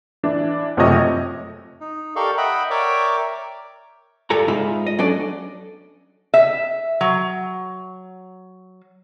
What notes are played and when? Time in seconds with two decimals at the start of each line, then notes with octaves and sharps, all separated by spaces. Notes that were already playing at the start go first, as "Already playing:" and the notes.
0.23 E3 D4
0.77 F#1 C3 F3 A3 C#5 D#5
1.81 D#4
2.16 G4 A4 A#4 D5 F5 C#6
2.38 D#5 E5 F#5 G5 B5
2.70 A#4 C#5 D5 E5 G5 D6
4.30 G2 F4 A4 G#5 A#5
4.48 G#2 D#4 F4 E5 B5
4.86 D#5
4.98 F#3 C#4 D4 A4 D5
6.34 E5
7.01 F#3